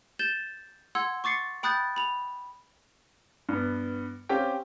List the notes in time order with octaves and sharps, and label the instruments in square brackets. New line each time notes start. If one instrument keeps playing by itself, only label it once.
[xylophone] G6 A6 E7 G7
F#5 C6 E6 G#6
C#6 D6 A6 C7 C#7
G5 B5 D#6 F#6 G6 A6
B5 F7
[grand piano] G2 B3
C4 C#4 G4 F5 G5